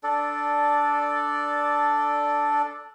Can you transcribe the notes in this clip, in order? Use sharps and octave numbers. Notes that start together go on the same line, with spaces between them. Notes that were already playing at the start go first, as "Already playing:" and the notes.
D4 A4 D5